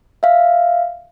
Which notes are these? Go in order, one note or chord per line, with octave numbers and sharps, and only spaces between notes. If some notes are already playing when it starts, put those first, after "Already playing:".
E5 F5